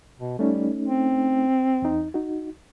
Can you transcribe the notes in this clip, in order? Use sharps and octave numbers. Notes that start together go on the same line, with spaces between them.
B2
G3 A3 C#4 D#4
C4
E2 D#4
D#4 F#4